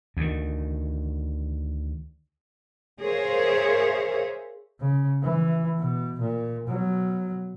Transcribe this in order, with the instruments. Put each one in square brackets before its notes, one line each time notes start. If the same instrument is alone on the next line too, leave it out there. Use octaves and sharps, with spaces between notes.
[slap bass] D2 D#3
[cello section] G#4 A#4 C5 C#5 E5 F5
[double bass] C#3
E3
B2
A#2
B2 F#3